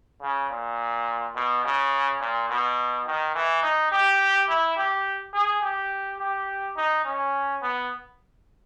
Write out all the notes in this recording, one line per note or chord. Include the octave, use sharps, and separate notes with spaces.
C#3
A#2
B2
C#3
A#2
B2
D#3
E3
D#4
G4
E4
G4
G#4
G4
G4
D#4
C#4
B3